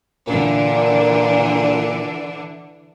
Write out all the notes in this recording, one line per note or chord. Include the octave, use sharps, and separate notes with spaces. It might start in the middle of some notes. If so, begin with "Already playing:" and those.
A#2 D3 E3 D4